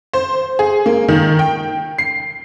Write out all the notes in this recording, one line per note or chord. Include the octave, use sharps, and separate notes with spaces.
C5
G#4
A#3
D#3
G5
C7